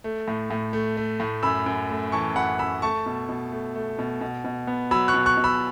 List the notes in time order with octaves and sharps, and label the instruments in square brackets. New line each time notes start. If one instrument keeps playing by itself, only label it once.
[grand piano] A3
A2
A2
A3
A3
A2
F#2 B5 E6
F#2
A3
E3 A5 C#6
F#2 F#5 B5
F#2 B5 E6
A3 A5 C#6
B2
B2
A3
A3
B2
B2
B2
B3
F#3 B5 E6
C#6 F#6
B2
C#6 F#6
B2
B5 E6